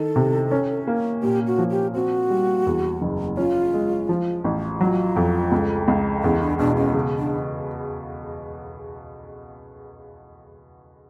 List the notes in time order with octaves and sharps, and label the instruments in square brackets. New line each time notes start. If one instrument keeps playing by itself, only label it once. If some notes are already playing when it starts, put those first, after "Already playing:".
Already playing: [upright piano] D#3 [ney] A4
[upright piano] C3
C#4
A#3
[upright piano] A#2 [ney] G4
[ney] F#4
[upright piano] F3
[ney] G4
[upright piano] C4 [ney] F#4
[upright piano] G3
E2
F#1
[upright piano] C#4 [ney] F4
[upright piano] G#3
F3
A1
[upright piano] F#3 [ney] F4
[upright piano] F2
C#2
C#2
[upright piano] E2 [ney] C#4
[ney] D4
[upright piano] B2 [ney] D4
[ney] C#4
[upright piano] C#3
[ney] D4